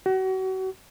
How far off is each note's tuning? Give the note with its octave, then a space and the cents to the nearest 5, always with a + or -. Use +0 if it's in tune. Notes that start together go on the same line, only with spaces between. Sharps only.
F#4 +35